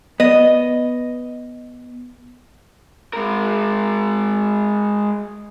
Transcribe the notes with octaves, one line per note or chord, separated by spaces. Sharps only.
B3 D#5
G#3 A#4